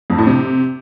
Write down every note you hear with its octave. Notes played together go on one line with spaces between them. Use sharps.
F2
A2
C3